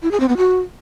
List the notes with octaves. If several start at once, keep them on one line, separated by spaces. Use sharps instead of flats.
E4
G#4
C4
B3
F#4